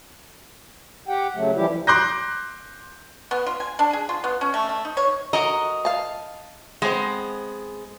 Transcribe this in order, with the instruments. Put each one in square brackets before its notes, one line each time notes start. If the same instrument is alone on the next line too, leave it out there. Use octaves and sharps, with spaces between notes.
[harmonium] G4 F#5 G5
C#3 F#3 A3
E3 F3 G3 E4 G4
[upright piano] C6 D6 F#6 G6 A#6
[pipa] B3
F4
G#5
D4
G#4
F4
B3
C#4
A3
A3
D#4
C#5
[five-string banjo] F#4 A#4 A#5 [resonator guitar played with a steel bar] D#5
[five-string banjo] F5 A5
[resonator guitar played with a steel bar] G#3 [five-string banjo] B3 C4